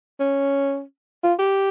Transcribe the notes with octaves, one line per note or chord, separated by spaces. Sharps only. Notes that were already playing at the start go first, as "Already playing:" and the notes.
C#4
F4
G4